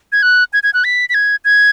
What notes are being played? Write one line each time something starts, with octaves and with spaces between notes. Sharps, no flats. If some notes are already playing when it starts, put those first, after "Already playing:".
G#6
F#6
G#6
G#6
F#6
B6
B6
G#6
G#6